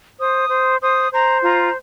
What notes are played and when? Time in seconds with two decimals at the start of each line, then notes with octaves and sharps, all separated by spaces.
0.19 C5 D#6
0.50 C5
0.80 C5 D#6
1.11 C5 A#5
1.42 F4 A#5